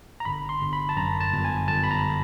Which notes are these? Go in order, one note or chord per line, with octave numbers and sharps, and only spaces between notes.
A#5
G1 B5
C6
G1
B5
A5
F#2 A#5
A5
G1
G#5
G1 A5
B5
A#5